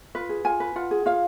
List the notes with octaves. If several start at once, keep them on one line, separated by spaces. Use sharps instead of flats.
F4 B4
G#4
F4 G#5
B4
F4 F#5
G#4
F4 F5